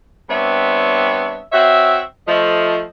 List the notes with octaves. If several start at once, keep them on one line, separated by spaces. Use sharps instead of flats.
G3 B3 C4 D4 C#5 E5
C4 F#4 C#5 E5
F3 A3 D#5